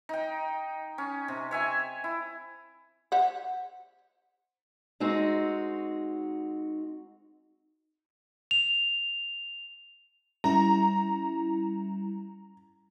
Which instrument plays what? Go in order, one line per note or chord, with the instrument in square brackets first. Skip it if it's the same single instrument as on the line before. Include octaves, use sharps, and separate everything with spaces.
[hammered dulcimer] D#4 G5
C#4
C3
C#5 E5 G#5 C#6
E4
[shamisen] C5 E5 F#5
[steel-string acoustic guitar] G#3 C4 D#4 F#4
[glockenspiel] F7
[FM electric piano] G3 C#4 E4 [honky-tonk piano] A#5